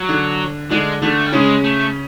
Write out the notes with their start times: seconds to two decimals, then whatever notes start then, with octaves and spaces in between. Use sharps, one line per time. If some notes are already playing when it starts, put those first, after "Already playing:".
Already playing: F#3
0.09 D3 D4
0.70 D3 G#3 D4
1.02 D3 A3 D4
1.27 G3
1.32 C#3 G#3 C#4
1.64 A3